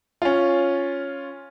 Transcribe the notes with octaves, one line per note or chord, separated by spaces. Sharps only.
C#4 F4